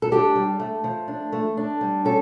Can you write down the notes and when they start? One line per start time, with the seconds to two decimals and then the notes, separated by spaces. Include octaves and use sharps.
0.02 A4
0.11 D4 G4
0.35 G3
0.60 A3
0.84 F3
1.08 D4
1.32 A3
1.57 D4
1.81 G3
2.05 C#4 A4